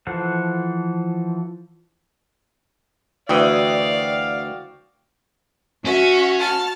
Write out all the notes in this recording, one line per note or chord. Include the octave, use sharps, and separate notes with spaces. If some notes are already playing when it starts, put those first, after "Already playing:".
E3 F3 A4 C5 F#5
D2 E3 F#4 D5 F5 G5 D#6
C#4 F#4 E5
A5 F6